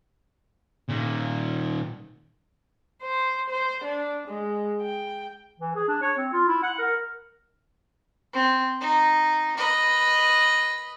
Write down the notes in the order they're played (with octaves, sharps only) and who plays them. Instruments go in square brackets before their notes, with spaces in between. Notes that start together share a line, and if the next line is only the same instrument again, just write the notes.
[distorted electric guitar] A#2 D#3
[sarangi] C5
C5
D4
G#3
G5
[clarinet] E3
G#4
D4
C#5
C4
F4
E4
F#5
A#4
[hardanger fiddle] C4
D#4
B4 D#5